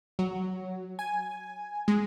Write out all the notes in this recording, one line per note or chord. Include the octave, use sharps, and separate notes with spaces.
F#3
G#5
G#3